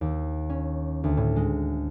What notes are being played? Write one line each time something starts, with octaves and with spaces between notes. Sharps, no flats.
D#2
C#4
D2
A2
G#3